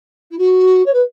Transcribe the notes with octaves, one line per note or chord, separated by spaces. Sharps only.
E4
F#4
C#5
B4